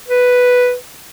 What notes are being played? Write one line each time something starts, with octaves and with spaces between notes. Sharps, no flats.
B4